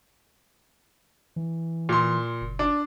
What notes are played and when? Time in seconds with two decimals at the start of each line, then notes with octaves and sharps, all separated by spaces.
1.36 E3
1.89 A#2 C6
2.41 F#1
2.59 D4